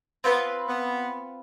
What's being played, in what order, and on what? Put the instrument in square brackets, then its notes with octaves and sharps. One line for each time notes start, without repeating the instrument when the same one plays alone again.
[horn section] B3 [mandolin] C4 F4 B4
[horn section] B3